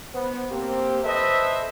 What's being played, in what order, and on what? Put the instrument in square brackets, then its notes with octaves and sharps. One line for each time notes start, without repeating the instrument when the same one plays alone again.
[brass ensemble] B3 C5
A#3 C4 G4
A4 B4 C5 D#5 E5